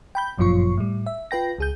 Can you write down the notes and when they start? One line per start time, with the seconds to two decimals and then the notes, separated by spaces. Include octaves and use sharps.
0.15 G5 B5 G6
0.38 G1 F#2 A#2 F3 F4 C#6
0.77 A2 G3
1.06 E5
1.31 F4 B4 G5 A#6
1.58 C#2 G#4 G6